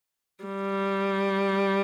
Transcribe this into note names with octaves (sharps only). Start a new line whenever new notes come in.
G3